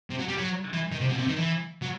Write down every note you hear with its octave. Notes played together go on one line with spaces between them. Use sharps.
C3
F#3
G3
F#3
E3
D#3
C3
B2
C3
D#3
E3
F#3